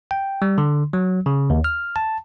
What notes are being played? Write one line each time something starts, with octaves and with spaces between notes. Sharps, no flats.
G5
G3
D3
F#3
C#3
D#2
F6
A5